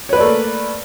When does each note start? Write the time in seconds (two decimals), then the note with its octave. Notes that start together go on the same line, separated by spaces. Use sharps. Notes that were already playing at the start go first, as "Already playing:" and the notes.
0.09 C#5
0.13 B4
0.16 D5
0.20 A3
0.24 A#3